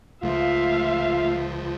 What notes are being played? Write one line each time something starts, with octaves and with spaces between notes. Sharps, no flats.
C#2 F3 A3 F4 E5 F5